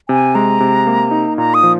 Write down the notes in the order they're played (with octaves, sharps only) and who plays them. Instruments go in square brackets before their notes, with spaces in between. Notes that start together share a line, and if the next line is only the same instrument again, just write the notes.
[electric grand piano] C3 [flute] G#5
[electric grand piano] G#3 [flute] A#5
[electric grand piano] C3
A#3
D#4
[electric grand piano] A#2 [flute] A#5
[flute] D#6
[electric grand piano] F3